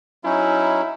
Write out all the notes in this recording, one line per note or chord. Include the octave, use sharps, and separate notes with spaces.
F#3 C#4 D#4 E4